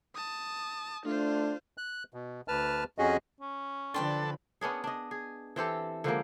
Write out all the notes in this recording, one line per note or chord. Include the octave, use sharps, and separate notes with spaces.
A5 D#6
A3 D4 F4 C5
F#6
B2
D2 B4 A5 F6
F2 C#4 F#4 G#4 D#5
C#4
D3 F3 D4 A4 B4 G5 A5 C6
B3 C#4 D4 G#4
D4 D#5
G#4
E3 C4 G4 A4
D3 F3 G#3 A#3